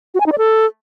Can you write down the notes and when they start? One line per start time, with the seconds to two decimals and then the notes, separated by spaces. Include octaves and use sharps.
0.14 F#4
0.20 G#5
0.26 D#4
0.32 D5
0.38 A4